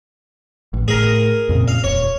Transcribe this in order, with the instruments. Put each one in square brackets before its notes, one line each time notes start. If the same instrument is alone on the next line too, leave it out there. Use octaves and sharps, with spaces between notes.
[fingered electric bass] A1
[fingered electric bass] A2 [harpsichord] G#4 A#4
[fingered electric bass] F2 A#2 C#3
[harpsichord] F5
[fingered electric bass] D#1 [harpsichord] C#5